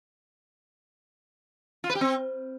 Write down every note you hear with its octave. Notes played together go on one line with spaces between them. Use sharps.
F4
B4
G4
C4